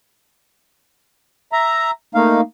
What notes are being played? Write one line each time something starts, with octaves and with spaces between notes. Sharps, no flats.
E5 A#5
A3 A#3 D#4 F5